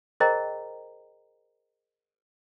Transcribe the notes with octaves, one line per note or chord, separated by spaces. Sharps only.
G#4 A#4 C5 D#5 G5 A#5